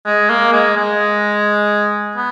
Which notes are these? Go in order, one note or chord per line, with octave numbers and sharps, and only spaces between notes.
G#3
A#3
G#3
G#3
B3